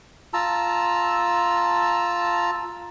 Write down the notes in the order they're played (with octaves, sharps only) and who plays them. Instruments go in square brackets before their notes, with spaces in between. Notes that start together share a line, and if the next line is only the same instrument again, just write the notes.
[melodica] F4 A5 A#5 E6